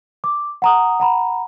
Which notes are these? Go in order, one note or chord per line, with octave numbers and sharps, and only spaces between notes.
D6
F#5 A#5 D#6
F#5 A#5 B5